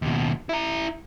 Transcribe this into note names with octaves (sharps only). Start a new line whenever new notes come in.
D#2 B2
E4 A#5